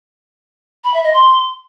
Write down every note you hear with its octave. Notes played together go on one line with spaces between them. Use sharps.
B5
E5
D#5
C6